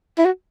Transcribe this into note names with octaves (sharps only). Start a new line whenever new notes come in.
E4
F#4